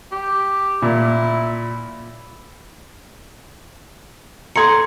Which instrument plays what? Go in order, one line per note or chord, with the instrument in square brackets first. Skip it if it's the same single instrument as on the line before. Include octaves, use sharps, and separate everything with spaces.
[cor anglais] G4
[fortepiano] A#2 [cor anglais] E4
[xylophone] A4 C#7 [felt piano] A#5 C6 G#6